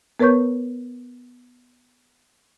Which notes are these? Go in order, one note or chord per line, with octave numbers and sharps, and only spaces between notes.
B3 A#4 B4 C#5 C#6 G6